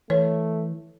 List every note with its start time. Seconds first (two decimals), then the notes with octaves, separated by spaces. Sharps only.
0.10 E3 A3 C#5